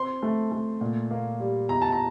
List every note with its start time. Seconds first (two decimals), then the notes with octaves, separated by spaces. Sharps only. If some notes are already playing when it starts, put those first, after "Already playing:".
Already playing: C4 C6
0.23 A3
0.52 A3
0.81 A#2
1.11 A#3
1.40 G3
1.69 E2 A#5
1.82 A5
1.92 A#5